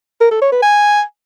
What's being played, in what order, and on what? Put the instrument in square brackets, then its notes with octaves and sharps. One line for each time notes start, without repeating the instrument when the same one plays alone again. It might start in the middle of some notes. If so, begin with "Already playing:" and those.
[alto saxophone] A#4
A4
C#5
B4
G#5